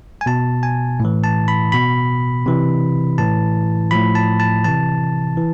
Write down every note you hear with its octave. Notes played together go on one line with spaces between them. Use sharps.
G#5
B2 A5
G#5
A2 E3
A5
B5
B2 B5
C3 E3
A2 E3 A5
A2 F3 B5
A5
A5
C3 E3 A5
E3